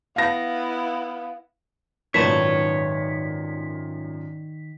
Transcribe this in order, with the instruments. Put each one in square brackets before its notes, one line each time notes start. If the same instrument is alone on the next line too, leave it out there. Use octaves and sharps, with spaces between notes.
[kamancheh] B3 E4 [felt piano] F5 A#6
[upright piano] G#1 F#2 A#2 [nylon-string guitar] D#3 B4 [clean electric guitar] C#5 A5 [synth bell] B6